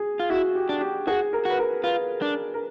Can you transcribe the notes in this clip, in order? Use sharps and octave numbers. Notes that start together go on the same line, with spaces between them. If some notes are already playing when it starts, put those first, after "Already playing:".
Already playing: G#4
F4
E4 F#4
G4
D4
G4
F#4 G#4
A#4
F#4 B4
A#4
F4 B4
D4
A#4